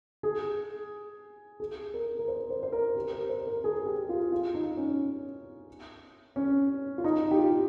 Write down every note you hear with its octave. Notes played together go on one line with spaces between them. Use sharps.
G#4
G#4
A#4
A#4
C5
C5
C5
A#4
G4
A#4
C5
A#4
G#4
G4
F4
F4
D#4
C#4
C#4
F4
D#4
G4
F4